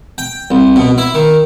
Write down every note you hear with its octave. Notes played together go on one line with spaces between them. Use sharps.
G5
C2
B2
E4
D#3